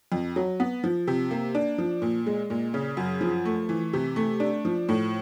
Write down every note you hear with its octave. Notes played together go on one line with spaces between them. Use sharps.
F2
F#3
B3
F3
C3
A#3
D4
F3
A#2
G#3
A#2
C#3
F#2
F3
A3
E3
C3
A3
D4
F3
A2